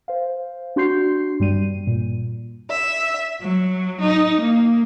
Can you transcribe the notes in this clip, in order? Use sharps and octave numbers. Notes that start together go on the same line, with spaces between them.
C5 F5
D4 F#4 C6 G6 C7
G2 G3 D#7
A#2
E5
F#3
D#4
A#3